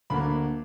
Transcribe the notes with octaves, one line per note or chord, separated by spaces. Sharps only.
D2 D3 A#3 B5